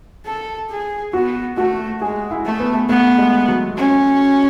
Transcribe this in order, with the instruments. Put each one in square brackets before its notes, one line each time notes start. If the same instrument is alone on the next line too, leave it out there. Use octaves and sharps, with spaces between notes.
[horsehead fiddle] A4
G#4
[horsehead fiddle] B3 [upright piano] F#4
[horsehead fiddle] A3 [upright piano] F#4
[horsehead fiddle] G#3 [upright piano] G#4
[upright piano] E4
[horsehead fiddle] A3
[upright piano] B3
[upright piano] A3 [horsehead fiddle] B3
[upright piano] G#3
F#3
[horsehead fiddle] C#4